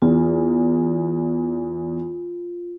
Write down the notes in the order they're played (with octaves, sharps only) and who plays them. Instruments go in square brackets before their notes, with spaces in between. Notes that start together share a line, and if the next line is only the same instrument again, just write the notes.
[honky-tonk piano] E2 [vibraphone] F4